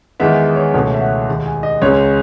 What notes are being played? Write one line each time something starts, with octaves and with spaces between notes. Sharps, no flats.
E2 D#3 G#3 B3 E5
C#5
C#2 B2 A3 C#4 C#5
E5
F#5
D#2 D#3 G#3
G#5
D#5
C#2 C#3 G#3 C#4 C#5